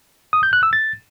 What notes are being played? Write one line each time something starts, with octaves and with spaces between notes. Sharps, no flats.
D#6
G6
F#6
E6
A6